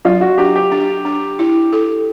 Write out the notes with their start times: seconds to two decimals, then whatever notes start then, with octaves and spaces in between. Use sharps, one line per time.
0.05 F#3 F4
0.21 F#4
0.38 D4 G4
0.56 G4
0.72 D4
1.05 D4
1.39 E4
1.73 A4